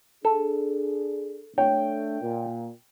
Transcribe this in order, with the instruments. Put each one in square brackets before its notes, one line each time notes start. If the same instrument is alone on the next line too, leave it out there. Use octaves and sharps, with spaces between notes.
[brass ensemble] D4 G#4 [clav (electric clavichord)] A4
[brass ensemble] A3 D4 [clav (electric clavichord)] C#5 [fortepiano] G5
[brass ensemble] A#2